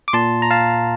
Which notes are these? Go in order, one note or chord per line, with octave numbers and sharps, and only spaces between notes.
D6
A#2 A5 C6
A#5
F5 A5